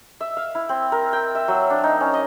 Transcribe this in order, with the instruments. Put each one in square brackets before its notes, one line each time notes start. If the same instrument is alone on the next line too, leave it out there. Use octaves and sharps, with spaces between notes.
[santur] E5
F5
E4
C4
A#4
G5
E5
F#3
D4
D#4
C#4
D#5